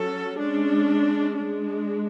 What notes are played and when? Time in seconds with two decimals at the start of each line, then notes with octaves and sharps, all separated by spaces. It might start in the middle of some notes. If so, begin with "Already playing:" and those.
Already playing: F#3 C#4 A4
0.39 G#3 C#4 D4
1.36 G#3 D4